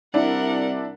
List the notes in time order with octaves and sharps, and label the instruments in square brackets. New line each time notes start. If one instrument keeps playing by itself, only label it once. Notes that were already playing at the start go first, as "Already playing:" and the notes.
[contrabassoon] C2 [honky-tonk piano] D4 E4 [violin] A#4 F#5